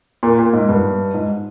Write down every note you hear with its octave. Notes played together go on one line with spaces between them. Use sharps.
A#2
A#2
G#2
G2
G#2